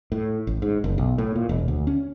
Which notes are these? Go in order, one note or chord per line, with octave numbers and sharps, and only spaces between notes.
A2
A1
G#2
F#1
B1
A2
A#2
E1
D2
C#4